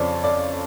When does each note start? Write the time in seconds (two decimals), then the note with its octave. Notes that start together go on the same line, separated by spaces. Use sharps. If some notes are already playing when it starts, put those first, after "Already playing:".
Already playing: F2 C#3 F3 C#5 D5
0.24 D5